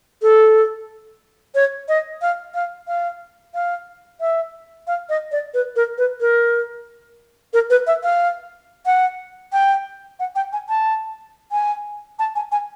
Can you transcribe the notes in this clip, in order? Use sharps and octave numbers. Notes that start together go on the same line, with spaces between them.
A4
C#5
D#5
F5
F5
F5
F5
E5
F5
D#5
D5
B4
A#4
B4
A#4
A#4
B4
E5
F5
F#5
G5
F#5
G5
G#5
A5
G#5
A5
G#5
G#5